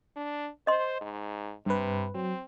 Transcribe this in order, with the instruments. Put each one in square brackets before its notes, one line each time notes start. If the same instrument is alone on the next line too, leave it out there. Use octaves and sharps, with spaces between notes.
[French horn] D4
[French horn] C5 [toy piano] D#5 C6
[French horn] G#2
[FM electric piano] G2 B4 [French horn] C3
[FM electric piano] F#3 [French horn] C4